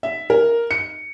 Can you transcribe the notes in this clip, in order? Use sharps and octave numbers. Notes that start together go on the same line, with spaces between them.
E5
A#4
C#7